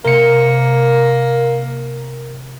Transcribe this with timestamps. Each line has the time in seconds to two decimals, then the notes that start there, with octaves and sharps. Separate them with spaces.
0.05 C3 A#3 A#4 C#7